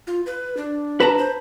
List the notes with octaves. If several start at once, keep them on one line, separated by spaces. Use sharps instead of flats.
F4
B4
D4
B4 A5 A#5
C5